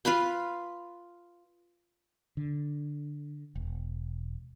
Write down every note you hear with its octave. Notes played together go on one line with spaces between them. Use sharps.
F4 B4 B5 C6
D3
E1